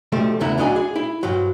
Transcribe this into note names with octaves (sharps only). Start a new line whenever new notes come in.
B1 F3 G3 A3
E2 A2 C#3 B3 E4 A#5
D2 F#3 D4 D#5 G#5 B5
G#4
E4
G2 F3 F#3